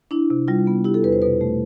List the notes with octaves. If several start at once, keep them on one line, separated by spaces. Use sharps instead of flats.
D4 E4
C3
G3 F4
B3
E4 G4
A4
E2 B4
C5
B2 B4
A3